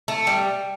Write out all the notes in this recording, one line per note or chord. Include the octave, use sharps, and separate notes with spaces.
A3
G3